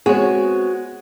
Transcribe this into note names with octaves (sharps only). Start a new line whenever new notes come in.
G#3 B3 C4 F#4 G#4 C#5